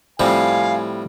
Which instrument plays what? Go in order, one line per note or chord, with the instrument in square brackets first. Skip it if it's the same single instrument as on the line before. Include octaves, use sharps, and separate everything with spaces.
[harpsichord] A2 G3 [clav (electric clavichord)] F3 C4 [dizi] F5 [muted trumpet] G#5